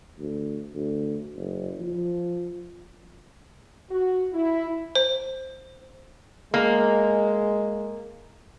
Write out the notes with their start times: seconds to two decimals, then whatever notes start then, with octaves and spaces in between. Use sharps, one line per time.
0.19 D2
0.74 D2
1.36 F#1
1.80 F3
3.90 F#4
4.33 E4
4.95 C5
6.54 G#3 A#3